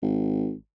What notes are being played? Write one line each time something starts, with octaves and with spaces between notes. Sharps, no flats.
G#1